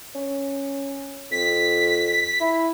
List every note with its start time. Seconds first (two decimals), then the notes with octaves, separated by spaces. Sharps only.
0.15 C#4
1.31 F2 B6
2.41 E4